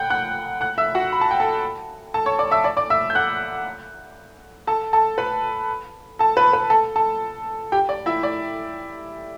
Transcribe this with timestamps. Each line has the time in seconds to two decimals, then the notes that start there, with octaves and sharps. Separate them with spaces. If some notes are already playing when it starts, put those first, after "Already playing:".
Already playing: F#5 G5 F#6 G6
0.10 F#5 F#6
0.61 F#5 F#6
0.78 E5 E6
0.95 F#4 F#5
1.12 B5
1.21 A5
1.31 G5
1.40 A4 A5
2.14 A4 A5
2.26 C#5 C#6
2.39 D5 D6
2.51 E5 E6
2.64 D5 D6
2.77 D5 D6
2.90 E5 E6
3.10 G6
3.15 F#5 F#6
4.67 A4 A5
4.93 A4 A5
5.18 B4 B5
6.19 A4 A5
6.37 B4 B5
6.53 B4 B5
6.70 A4 A5
6.96 A4 A5
7.72 G4 G5
7.89 D5
8.06 E4 E5
8.23 D5